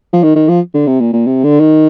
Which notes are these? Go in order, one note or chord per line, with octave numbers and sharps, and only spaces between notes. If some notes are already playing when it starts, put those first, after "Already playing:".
F3
D#3
D#3
F3
D3
C3
A#2
A#2
C3
D3
D#3